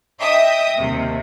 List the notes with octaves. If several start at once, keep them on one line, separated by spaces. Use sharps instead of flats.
D#5 E5 G5 D#6
D#2 C3